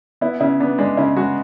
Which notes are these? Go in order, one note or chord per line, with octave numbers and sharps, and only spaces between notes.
B3 E4
C#3 E4
B3 D4
G#3 D4
C#3 E4
G#3 F#4